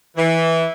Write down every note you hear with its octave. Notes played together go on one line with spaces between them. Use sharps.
E3